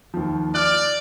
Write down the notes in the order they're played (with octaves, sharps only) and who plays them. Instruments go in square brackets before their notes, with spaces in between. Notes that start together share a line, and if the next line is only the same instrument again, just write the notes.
[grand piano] D#2 F3
[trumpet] D5 [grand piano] D6 F6 F#6